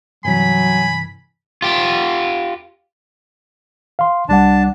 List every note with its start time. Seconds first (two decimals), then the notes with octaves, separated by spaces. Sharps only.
0.25 G2 C3 E3 F#3 G#5 B5
1.62 F4 G4
3.99 F5 C6
4.29 C2 G3 D4 F#5 A5